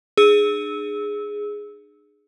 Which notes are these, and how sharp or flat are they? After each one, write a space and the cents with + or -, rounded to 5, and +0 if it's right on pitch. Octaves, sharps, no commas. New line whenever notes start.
D4 +40 G#4 +0 E6 -20